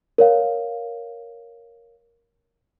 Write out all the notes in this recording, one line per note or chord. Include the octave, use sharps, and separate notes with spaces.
A#4 C#5 F5